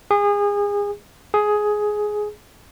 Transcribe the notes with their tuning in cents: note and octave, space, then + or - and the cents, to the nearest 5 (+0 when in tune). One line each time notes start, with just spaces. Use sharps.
G#4 -30
G#4 +10